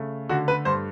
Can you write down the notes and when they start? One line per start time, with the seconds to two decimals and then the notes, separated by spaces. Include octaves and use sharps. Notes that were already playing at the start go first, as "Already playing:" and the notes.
Already playing: C#3 A3
0.29 D3 F#4
0.48 B4
0.65 G2 C5